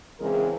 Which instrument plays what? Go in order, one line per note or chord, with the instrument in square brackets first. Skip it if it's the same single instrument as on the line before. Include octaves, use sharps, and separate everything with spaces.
[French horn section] E2 C#3 E3 G#3 C4 A#4